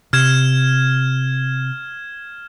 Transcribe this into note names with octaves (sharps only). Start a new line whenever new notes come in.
C3 F6 G#6 E7